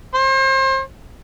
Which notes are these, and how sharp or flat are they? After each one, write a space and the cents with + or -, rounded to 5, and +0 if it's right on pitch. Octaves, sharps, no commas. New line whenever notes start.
C5 +35